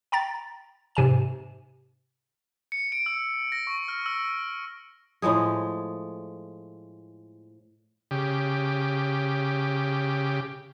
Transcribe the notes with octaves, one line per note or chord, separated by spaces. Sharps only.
G5 A#5 A6
G#2 C3 G#5 E7
C#7
D7
E6
A#6
C#6
F6
E6
A2 F3 G#3 G#4
C#3 G4